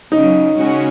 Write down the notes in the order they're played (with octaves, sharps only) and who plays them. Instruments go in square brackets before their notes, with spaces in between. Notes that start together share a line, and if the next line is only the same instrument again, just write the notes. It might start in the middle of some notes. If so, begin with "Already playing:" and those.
[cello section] C#3 F#3 C#4 [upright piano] D#4
[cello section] C#3 G#3 C#4 F#4